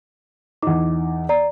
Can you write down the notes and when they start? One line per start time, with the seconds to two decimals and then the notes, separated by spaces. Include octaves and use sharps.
0.63 E2 D#4 D6
1.29 D5 A#5